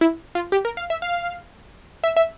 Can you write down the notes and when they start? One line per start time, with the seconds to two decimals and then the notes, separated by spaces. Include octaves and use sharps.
0.01 E4
0.35 F4
0.52 G4
0.65 A#4
0.77 F5
0.90 E5
1.02 F5
2.04 E5
2.16 E5